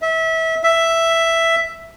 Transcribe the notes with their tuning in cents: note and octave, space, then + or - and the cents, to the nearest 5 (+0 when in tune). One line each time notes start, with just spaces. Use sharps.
E5 -25
E5 +5